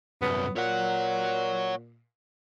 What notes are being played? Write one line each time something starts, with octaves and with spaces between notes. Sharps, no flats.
C2 F#2 B3
A#2 C#5 F#5